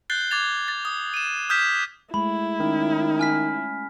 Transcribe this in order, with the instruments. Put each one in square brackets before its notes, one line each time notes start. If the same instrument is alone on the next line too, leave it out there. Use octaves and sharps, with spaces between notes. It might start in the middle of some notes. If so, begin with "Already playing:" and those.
[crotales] F#6 G6 A6 C7 G7
D6 G#6 A6 F7
A6
D#6
D#7 E7
D#6 F6 G6 G#6 B6 E7
[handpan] G#3 A3 [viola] E4 [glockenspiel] B5
[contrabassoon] D#3 [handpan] C#4
[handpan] C#4 [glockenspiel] G#5 F6 B6